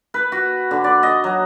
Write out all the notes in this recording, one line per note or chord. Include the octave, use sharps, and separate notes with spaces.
B4
F#4
D3
D5
D#5
F#3